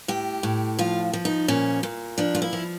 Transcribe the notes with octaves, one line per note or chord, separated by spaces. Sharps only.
A2 G4
A2
F3 F4
F3
D#4
A#2 C#4
A#2
F3 D4
F4
E4
F3